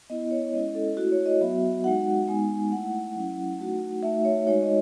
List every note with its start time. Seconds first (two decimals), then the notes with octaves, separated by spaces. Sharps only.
0.10 B3 E4 D#5
0.31 C#5
0.53 G#3 C#4 E4 D#5
0.75 A4
0.97 A3 E4 F#4
1.12 C#5
1.26 D#5
1.41 F#3 B3 F#4 E5
1.84 G#3 D#4 F#4 F#5
2.28 G#3 B3 D#4 G#5
2.71 A3 E4 F#5
3.15 F#3 C#4 E4
3.59 A3 D#4 F#4
4.03 A3 D#4 F#4 E5
4.25 C#5
4.46 G#3 D#4 F#4 C#5
4.62 D#5